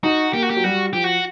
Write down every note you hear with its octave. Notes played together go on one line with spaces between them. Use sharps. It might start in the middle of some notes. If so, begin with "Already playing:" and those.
D#4 F#4
A#3 G4
F#4
G4
F#3
G3 F#4
F3 G4
F#4